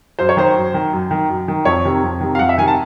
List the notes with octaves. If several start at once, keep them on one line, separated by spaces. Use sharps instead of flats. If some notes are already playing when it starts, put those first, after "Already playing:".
F#2 C5
C#5
D#3 C5
F#2
D#3
F#2
D#3
F#2
D#3
F2 C#5
C3 D#3
F2
C3 D#3
F5
F2 F#5
E5
C3 D#3 G#5
A5